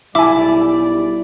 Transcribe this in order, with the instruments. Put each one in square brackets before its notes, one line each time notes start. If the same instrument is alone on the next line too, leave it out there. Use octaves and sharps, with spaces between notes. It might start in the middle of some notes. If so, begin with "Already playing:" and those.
[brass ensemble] B1 G3 D5 [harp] E4 [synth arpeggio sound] E5 G#5 [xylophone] D6